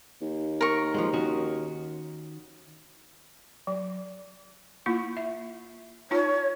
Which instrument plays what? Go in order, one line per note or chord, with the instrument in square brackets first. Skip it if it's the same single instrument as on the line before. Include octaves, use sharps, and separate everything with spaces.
[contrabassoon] D#2
[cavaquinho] A#4 C#6
[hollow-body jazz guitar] F3 F#3 G#3
D#3 C#4 F#4
[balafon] F#3
A#3 E4 F4
E5
[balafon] D#4 F4 A5 [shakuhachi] C#5